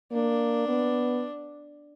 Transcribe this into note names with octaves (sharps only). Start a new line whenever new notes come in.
A#3 D4
B3